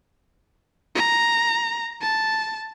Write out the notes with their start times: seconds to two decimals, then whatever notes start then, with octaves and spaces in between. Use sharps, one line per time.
0.96 A#5
2.02 A5